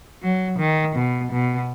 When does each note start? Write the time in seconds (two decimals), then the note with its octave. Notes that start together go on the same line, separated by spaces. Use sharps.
0.22 F#3
0.59 D#3
0.95 B2
1.31 B2